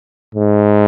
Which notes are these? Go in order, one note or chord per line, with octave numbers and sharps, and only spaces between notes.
G#2